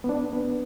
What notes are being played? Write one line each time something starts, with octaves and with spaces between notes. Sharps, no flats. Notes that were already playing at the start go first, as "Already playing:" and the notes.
B3
D4
B3